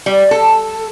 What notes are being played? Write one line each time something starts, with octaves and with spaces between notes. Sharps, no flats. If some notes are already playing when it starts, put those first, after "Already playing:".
G3
A4